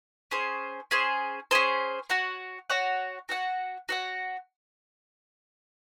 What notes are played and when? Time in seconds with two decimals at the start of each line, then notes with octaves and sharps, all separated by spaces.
0.31 C#4 G#4 C5
0.91 C#4 G#4 C5
1.51 C#4 G#4 C5
2.10 F#4 C#5 F#5
2.70 F#4 C#5 F#5
3.29 F#4 C#5 F#5
3.89 F#4 C#5 F#5